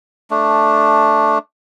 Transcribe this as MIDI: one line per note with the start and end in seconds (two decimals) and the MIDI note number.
0.31 1.38 57
0.31 1.38 62